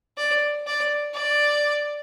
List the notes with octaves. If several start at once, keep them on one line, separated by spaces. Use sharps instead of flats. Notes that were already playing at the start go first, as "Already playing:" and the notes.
D5
D5
D5